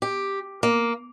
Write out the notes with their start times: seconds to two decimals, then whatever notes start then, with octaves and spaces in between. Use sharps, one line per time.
0.02 G4
0.63 A#3